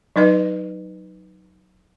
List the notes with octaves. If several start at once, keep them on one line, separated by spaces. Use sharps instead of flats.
F#3 D#4 B4 D#5